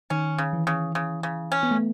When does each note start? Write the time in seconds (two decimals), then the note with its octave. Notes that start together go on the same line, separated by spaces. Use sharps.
0.10 D#3 C#4
0.38 C#3
0.53 E3
0.67 C#3
0.95 C#3
1.23 C#3
1.52 C#4
1.63 B3
1.71 A3